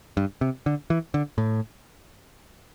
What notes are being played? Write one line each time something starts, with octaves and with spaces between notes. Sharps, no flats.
G2
C3
D3
E3
D3
A2